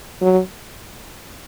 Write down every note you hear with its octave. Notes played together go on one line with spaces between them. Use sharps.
F#3